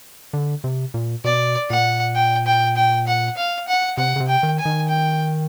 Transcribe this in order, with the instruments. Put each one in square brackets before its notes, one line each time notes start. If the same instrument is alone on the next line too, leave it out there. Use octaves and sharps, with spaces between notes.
[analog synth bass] D3
C3
A#2
[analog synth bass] B2 [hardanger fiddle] D5
[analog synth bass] A#2 [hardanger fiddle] F#5
[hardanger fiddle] G5
G5
G5
F#5
F5
F#5
[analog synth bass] C3 [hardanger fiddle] F#5
[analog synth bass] C#3
C3
[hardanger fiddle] G5
[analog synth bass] D#3
[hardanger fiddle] G#5
[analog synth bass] D#3
[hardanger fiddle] G5